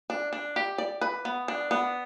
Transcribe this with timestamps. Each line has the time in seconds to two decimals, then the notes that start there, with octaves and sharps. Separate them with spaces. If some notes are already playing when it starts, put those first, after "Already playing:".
0.10 D4
0.33 D4
0.56 G4
0.78 D5
1.01 B4
1.25 B3
1.48 D4
1.71 B3